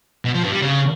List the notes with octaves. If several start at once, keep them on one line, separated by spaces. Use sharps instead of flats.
B2
F3
G2
G3
C#3